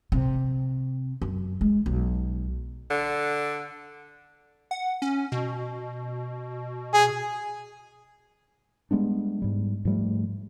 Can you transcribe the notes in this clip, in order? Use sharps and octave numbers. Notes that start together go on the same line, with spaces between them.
C3
F#2
G#3
B1
D3
F#5
C#4
B2
G#4
G3 G#3 B3 D4
G#2 G3
G#2 F3 G3 A3